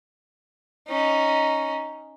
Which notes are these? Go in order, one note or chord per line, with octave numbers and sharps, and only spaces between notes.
C#4 D#4